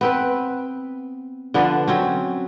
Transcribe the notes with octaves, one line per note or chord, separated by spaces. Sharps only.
B3 C4 B4
D3 F3 B3 D4
F#3 C4 C#4